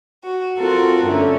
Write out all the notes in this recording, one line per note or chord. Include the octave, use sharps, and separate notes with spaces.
F#4
C4 F4 F#4 A4 A#4
G2 D3 A3 C#4